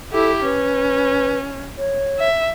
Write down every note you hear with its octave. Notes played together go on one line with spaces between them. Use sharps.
E4 G4 A4
C#4 B4
C#5
E5